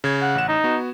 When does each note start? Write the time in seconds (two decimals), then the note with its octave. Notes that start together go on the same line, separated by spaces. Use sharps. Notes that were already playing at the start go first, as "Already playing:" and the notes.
0.04 C#3 G#6
0.22 F#5
0.35 A1 E7
0.48 D#4
0.64 B3 F#4